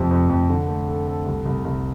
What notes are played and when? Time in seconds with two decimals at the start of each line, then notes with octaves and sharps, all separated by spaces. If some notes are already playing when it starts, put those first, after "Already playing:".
Already playing: F2 C3
0.11 F2
0.29 F2
0.49 D3
0.68 A3
0.88 A4
1.07 A4
1.26 C2
1.45 C2
1.65 C2